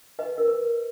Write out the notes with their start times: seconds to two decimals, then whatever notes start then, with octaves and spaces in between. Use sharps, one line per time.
0.19 B4 D#5
0.38 A#4
0.48 B4